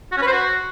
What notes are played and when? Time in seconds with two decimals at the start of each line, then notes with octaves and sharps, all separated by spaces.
0.12 F#4
0.17 C#4
0.22 B4
0.27 C5
0.32 F#4